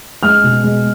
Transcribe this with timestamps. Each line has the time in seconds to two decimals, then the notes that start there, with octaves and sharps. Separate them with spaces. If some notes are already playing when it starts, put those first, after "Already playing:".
0.23 G#3 F6
0.44 B2
0.64 G#3